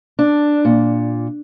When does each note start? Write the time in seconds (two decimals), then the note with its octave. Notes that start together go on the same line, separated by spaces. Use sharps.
0.19 D4
0.65 A#2